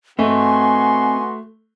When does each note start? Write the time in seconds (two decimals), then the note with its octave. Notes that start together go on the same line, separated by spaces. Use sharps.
0.19 A3 B3 C4 F#4 D#5 G#5 C6